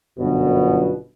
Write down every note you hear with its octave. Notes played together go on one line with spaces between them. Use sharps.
G1 F#2 B2